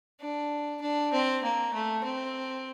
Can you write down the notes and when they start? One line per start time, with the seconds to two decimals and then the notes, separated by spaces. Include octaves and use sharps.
0.20 D4
0.81 D4
1.13 C4
1.43 A#3
1.74 A3
2.04 C4